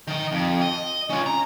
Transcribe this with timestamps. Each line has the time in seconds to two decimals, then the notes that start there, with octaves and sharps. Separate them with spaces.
0.08 D#3 D#5
0.32 F2
0.61 D#5
1.10 C#4 F4
1.26 A#5